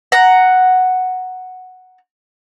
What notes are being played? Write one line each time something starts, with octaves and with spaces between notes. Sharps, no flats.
F#5 A#5